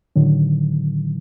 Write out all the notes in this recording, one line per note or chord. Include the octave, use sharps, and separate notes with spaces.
A2 D3 D#3 F#3